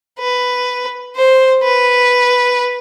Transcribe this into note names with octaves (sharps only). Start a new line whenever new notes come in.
B4
C5
B4